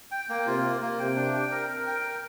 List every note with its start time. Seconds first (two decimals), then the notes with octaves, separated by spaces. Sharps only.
0.11 G5
0.29 A#3
0.47 C3 F4
0.64 A#3
0.82 A#3
0.99 C3 G5
1.16 D4
1.34 G5
1.51 A#4
1.69 A#4
1.87 G5
2.04 A#4